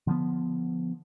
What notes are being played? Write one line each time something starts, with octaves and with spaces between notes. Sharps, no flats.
D3 F3 B3